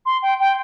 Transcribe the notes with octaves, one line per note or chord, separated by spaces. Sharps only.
C6
G5
G5